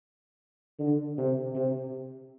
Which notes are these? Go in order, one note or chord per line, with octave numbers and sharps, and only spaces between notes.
D3
C3
C3